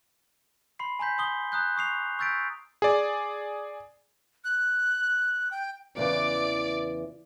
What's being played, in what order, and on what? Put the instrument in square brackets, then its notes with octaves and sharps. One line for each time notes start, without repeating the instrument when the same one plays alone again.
[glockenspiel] B5 C6 C7
G#5 A#5 C6 G6 B6
C6 D#6 G7
A#5 D#6 F#6 G6
C#6 D#6 C7 F7
C#6 E6 G6 A6 B6 D7
[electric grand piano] G#4 D5
[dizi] F#6
G5
[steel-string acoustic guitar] E2 C#3 E3 [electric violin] D5 D6